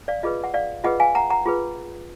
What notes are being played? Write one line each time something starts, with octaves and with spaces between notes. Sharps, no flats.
D5 F5
F4 G#4 B4 D#5
F#5
D5 F5
F4 G#4 B4 D#5 F#5
F5 G#5
F#5 A#5
F#5 A#5
F4 G#4 B4